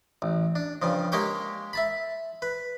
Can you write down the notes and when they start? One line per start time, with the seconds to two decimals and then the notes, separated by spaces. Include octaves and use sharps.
0.22 A1
0.55 D4
0.82 G2 C#3 F3
1.12 G#3 A#3 G4 C#5 G5 D6
1.73 E5 A5 B5
2.42 B4